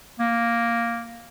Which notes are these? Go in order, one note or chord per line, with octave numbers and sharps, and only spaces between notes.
A#3